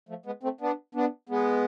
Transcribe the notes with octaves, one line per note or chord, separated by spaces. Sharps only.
F3 A3
G#3 B3
A3 C4
B3 D4
B3 D4
G#3 B3